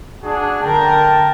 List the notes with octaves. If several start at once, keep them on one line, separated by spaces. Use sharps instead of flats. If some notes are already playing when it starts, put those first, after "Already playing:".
D4 F#4 G#4
D3 A#4 G5 A5